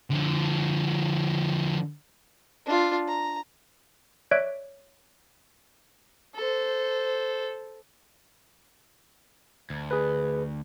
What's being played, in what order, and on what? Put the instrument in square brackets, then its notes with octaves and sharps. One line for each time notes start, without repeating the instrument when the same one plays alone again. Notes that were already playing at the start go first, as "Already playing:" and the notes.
[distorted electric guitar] D3 F3
[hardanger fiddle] D4 F4
A#5
[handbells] C#5 D5 E5 F#6 D7
[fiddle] A4 C5
[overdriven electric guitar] D2
[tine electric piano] G#4 B4